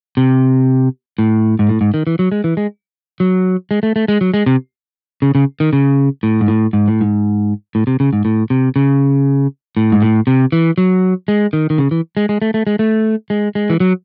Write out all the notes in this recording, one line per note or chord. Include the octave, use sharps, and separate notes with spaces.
C3
A2
G#2
A2
G#2
D#3
E3
F#3
G#3
E3
G#3
F#3
G#3
A3
A3
G#3
F#3
G#3
C3
C#3
C#3
D#3
C#3
A2
G#2
A2
G#2
A2
G#2
A2
C3
C#3
G#2
A2
C3
C#3
A2
G#2
A2
C3
E3
F#3
G#3
D#3
D#3
C#3
E3
G#3
G#3
A3
A3
G#3
A3
G#3
G#3
E3
F#3